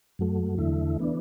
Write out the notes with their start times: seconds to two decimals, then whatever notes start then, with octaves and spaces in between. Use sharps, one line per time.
0.19 F#2 F#3 A3
0.58 E2 D3 A3 E4
0.99 E3 B3 D4